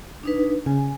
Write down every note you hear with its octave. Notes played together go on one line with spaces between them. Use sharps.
D4 D#4 B4
C#3 G#5